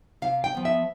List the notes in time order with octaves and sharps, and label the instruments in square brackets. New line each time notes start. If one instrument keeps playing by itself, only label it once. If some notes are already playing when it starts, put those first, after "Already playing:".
[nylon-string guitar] C3 F5
G5
F3 B3
E5